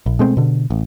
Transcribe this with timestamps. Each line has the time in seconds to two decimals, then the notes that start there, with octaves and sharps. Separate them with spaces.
0.06 A#1
0.19 B2 G#3 A3 C4
0.37 B2 D3
0.70 A1